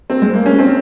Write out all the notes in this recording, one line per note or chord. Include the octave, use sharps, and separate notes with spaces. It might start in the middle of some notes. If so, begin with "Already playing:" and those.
C4
G#3
A#3
C#4
C4